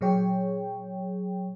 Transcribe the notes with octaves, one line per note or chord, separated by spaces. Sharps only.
A#2 F#3 G#4 C#5 G5